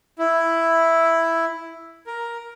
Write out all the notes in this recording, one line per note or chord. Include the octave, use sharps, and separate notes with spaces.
E4
A#4